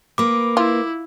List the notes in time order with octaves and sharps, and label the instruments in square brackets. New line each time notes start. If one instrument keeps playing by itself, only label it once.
[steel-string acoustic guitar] A#3 B4 [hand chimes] D6
[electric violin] E4 [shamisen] F4